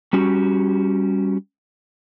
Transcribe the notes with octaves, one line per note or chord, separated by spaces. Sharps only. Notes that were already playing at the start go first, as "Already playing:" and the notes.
G3 C#4 F#4 G4